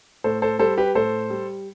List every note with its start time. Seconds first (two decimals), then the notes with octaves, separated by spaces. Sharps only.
0.24 A2 A4 C5
0.42 A4 C5
0.59 G3 A4 C5
0.78 G4 B4
0.95 A2 A4 C5
1.30 G3